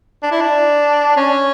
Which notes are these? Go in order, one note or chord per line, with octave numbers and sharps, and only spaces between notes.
D4
E4
D4
C#4